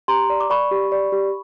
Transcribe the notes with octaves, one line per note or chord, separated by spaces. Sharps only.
G4 A#5 C6
D5
D6
D5 B5 C#6
G4
D5
G4